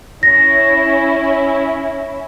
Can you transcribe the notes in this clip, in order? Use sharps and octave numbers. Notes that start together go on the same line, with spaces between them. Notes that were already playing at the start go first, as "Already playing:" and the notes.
C#4 E4 A#6